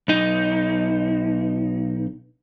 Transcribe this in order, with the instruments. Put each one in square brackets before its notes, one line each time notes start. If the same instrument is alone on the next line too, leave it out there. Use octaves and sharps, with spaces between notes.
[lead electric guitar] B1 D#4